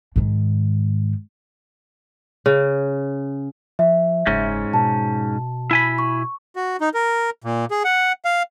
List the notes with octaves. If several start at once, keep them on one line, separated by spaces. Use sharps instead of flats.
G#2 D#3
C#3
F3 E5
F#1 G#2 C#4
B2 A5
E4 G#5 B5
C#6
F#4
D#4
A#4
A#2
G#4
F#5
F5